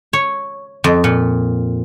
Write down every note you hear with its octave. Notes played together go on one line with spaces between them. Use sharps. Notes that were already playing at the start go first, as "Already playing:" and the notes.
C#5
F2
A#2